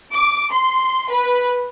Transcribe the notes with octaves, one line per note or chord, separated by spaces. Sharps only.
D6
C6
B4